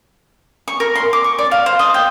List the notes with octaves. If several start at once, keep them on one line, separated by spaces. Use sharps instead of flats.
C#6
A#4
C6
D6
C#6
D5
F5
C5
D#5
G5